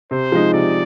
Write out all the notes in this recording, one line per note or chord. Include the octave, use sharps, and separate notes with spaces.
C3 C5
F3 G#3 D#4
C3 D5